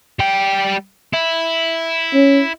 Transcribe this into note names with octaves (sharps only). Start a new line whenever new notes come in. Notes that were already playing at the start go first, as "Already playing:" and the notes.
G3 G5
E4
C#4